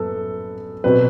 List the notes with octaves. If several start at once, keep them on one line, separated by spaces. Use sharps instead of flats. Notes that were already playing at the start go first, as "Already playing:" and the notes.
Already playing: F#2 B3 A4
B2 F#3 C4 B4